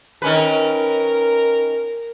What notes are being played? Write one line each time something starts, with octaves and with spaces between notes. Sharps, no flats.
D#3 C#4 A#4 B4